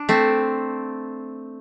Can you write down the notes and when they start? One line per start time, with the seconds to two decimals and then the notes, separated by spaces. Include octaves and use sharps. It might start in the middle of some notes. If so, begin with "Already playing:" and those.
Already playing: D4
0.09 A3 C4